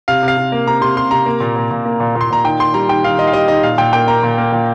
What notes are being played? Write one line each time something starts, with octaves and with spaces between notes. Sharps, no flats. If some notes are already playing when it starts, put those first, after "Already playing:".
C3 F5
C3
F5
C3
A#3
C3 A#5
C3 C6
C3 C6
C3 A#5
A#3
A#2
A#2
A#2
A#3
A#2
A#2
C6
A#2 A#5
D#3 G5
D#3 C6
G3 A#5
D#3 G5
D#3 F5
D#3 D#5
F5
G3 D#5
D#3 D#5
A#2 F5
A#2 G5
A#3 G5
A#3 A#5
A#2
A#3
A#2